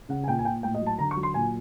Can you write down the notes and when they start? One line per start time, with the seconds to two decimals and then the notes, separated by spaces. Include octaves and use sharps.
0.09 C#3 F#5
0.24 G#5
0.27 A#2 G5
0.39 G#5
0.45 A#2 G5
0.63 A2 G5
0.75 D#5
0.81 F#3
0.86 A5
0.99 D3 A#5
1.11 C#6
1.16 F#3
1.23 C6
1.34 A#2 G#5